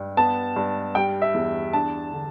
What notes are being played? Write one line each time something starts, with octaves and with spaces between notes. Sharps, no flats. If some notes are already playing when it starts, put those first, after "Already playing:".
Already playing: G2
B3 A5
G2
G3 G5
E5
E2
D4 A5
D3